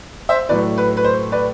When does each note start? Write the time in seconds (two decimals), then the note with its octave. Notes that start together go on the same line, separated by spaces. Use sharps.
0.29 C5 E5
0.49 A2 F#3 A3 B4 D5
0.78 B4
0.97 B4
1.05 C5
1.32 B4 D5